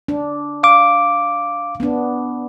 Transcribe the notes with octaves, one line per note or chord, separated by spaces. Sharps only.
D4
F5 D6
B3 D4